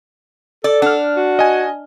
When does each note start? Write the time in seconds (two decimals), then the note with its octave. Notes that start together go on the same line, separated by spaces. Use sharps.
0.64 A4 D5
0.82 D4 F#5 F6
1.16 F#4
1.39 D#5 G#5